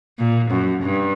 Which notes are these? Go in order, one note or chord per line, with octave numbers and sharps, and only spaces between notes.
A#2
F#2
G2